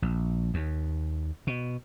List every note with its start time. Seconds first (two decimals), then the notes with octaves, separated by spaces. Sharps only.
0.02 A#1
0.54 D#2
1.47 B2